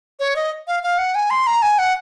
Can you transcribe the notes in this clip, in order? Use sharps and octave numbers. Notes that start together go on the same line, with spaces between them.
C#5
D#5
F5
F5
F#5
G#5
C6
A#5
G#5
F#5